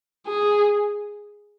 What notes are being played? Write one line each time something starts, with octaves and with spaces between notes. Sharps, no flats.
G#4